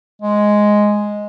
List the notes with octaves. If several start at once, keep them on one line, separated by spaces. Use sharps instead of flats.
G#3